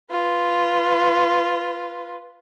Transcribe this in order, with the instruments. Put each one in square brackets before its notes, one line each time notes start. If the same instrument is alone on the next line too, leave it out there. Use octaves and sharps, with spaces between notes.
[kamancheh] F4 B4